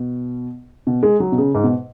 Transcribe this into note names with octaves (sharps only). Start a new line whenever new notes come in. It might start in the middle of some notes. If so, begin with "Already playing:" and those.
Already playing: B2
B2
G#3
F#3
B2
C#3
G#2
B2